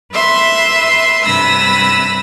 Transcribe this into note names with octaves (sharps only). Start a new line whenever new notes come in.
B4 E5 C6
G2 C3 B4 B5 E6 A#6